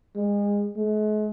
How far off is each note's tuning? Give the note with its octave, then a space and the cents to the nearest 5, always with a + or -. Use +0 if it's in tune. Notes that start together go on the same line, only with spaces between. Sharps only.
G#3 -30
G#3 +45